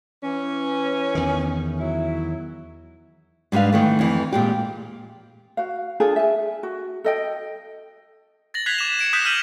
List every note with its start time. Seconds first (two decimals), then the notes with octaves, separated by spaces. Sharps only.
0.24 E3 C#4
1.15 E2 D#3
1.80 F#3 E4
3.52 G#2 G3 D4 B4 F5
3.73 D#3 E3 A3
3.99 F2 E3
4.33 A#2 G#3 G4
5.57 F#4 F5
6.00 D4 F4 G#4 A4
6.16 E5 G#5
6.63 F#4
7.04 A4 D#5 G5
8.54 A6 A#6 F#7
8.66 F#6 G#6 B6 C7 F7 F#7
8.78 D6 E7
8.99 C#7 D7 E7
9.13 D#6 F#6 G6 B6
9.25 F6 G6 B6 D#7 F#7